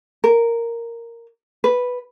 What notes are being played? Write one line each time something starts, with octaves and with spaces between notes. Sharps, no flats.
A#4
B4